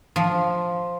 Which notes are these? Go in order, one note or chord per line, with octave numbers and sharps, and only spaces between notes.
F3